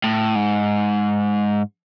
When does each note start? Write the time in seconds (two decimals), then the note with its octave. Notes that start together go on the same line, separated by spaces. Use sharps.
0.04 A2
0.35 G#2